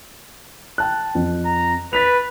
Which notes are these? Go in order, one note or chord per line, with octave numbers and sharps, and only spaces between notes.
G5 A5 F#6
F2
A#5
B4 A6 B6 F7